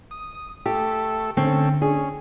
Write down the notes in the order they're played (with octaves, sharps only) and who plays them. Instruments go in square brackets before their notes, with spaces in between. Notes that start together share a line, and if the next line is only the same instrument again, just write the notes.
[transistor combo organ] D#6
[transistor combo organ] A3 A4 [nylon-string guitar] G4
[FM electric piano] D3 [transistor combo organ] A3 C#4 A4 [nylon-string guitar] C4
[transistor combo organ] C#4 [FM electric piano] D4 [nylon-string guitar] G#4